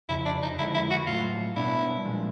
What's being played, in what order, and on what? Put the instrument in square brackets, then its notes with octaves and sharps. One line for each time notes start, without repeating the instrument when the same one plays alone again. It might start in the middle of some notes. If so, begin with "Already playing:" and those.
[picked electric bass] F2 C#3 F3 [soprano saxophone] E4
[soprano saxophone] D4
D#4
[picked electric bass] F2 D3 F3 G#3 [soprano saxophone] E4
[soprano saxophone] E4
F#4
[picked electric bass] A2 F#3 A3 [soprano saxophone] F4
[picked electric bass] B2 G3 B3 D4 [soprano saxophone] E4
[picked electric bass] A#2 F3 G#3